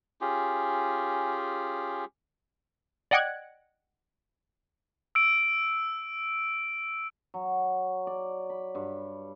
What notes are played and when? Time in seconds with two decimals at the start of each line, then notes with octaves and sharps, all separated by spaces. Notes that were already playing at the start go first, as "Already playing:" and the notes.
0.21 C#4 F4 G4 G#4
3.11 D5 D#5 F#5 G5 F#6 G#6
5.15 E6 D7
7.34 F#3
8.07 D5
8.50 B5
8.75 G2